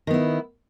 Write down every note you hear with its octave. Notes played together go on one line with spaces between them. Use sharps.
D#3 B3 E4